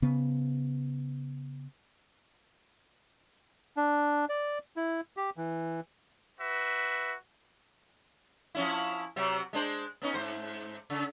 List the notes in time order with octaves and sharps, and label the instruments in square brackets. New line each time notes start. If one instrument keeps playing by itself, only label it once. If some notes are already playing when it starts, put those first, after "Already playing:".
[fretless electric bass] C#3 B3
[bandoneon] D4
D5
E4
G4
E3
[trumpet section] F#4 B4 E5
[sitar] F3 C#4 E4
C3 F#3 C4
G#3 D4 C5
B3 C#4 D#4
G#2 C5
C#3